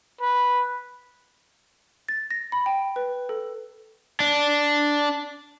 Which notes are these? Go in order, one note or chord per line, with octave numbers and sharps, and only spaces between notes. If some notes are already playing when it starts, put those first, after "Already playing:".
B4
A6
A#6
B5
G5
B4
A4
D4